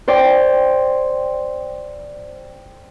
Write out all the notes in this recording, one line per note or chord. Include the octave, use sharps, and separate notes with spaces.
C5 D5 G5 D6